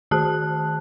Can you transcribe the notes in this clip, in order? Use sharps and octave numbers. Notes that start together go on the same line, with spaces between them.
D#3 F#4 G#4 A5 F#6